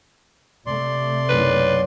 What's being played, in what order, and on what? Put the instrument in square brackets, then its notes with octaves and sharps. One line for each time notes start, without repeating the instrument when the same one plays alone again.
[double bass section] C3 A3 [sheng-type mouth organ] D5 C6
[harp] F#1 B1 [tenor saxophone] B4